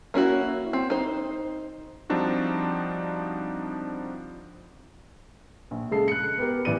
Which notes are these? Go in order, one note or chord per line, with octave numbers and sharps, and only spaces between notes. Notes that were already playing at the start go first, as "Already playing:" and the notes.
A#3 C#4 E4 F#4
C4
D#4 C5
F3 G3 C4 D4 D#4 F#4
A#1
C#3 G#3 A4 C7
F#6 C#7
B3 G4 A#4
A1 E3 B3 B4 D5 D#7